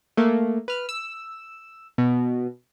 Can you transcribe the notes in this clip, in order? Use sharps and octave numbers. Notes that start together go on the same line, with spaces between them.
A3 A#3
B4 F6
E6
B2